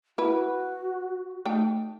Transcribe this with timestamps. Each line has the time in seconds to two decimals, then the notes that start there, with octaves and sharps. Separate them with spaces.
0.18 E4 F#4 B4
1.45 A3 D#4 G5